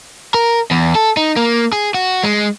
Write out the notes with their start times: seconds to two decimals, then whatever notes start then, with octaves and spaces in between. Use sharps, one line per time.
0.34 A#4
0.71 E2
0.95 A4
1.17 D#4
1.36 A#3
1.73 G#4
1.94 F#4
2.23 G#3